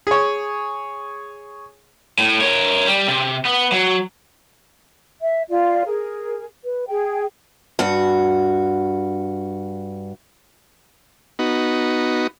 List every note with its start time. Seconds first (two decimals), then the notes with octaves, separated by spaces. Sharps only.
0.07 G#4 C#5
2.18 A2
2.41 A#4 C#5
2.87 G3
3.08 C3
3.45 B3
3.72 F#3
5.22 E5
5.50 F4 D5 F5
5.85 G#4 A#4
6.64 B4
6.88 G#4 G5
7.79 G2 F#4
11.39 B3 D#4 F#4